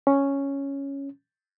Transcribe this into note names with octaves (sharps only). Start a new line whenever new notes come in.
C#4